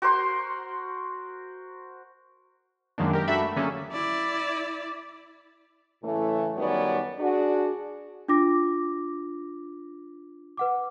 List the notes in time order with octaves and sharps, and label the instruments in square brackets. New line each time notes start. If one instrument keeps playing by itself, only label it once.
[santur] F#4 A#4 C5 C6
[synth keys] F#2 D#3 G#3 A#3 D4
G4 A#4
D4 F#4 A4 E5 B5
A3
D3 F#3 A#3 C#4 G#4 A4
[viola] E4 D5
[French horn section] A2 C#3 E3 A3
F#2 D#3 G3 B3 C#5 D5
D4 F#4 G#4
[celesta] D4 F4 D6 A#6
B4 F#5 D6